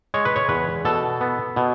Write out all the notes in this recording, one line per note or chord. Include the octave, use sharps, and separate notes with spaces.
G#3 C#5
B4
C#5
E2 B4
B2 A4
B3
B2